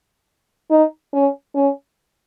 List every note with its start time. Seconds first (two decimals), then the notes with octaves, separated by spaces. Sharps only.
0.70 D#4
1.13 C#4
1.55 C#4